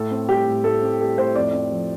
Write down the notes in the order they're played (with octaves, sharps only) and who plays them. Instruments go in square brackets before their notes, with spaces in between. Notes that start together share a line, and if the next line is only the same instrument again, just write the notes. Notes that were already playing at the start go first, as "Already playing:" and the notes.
Already playing: [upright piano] A2 A4
C4
G3 G4
A2
A2 A4
C4
G3 A4
A2 C5
F2 D5
C4
F3